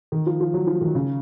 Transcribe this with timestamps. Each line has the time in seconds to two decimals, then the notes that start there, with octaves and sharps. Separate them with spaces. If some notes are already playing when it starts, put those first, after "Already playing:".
0.12 D#3
0.26 F3
0.40 F3
0.54 F#3
0.67 F3
0.81 D#3
0.95 C#3